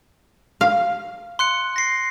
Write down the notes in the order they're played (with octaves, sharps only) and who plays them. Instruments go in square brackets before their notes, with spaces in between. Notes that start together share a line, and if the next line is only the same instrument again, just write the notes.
[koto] F5
[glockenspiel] C6 F#6 C#7
A#6 C7